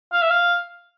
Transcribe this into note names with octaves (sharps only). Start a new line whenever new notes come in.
F5
E5
F5